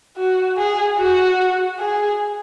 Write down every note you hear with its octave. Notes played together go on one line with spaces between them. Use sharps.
F#4
G#4
F#4
G#4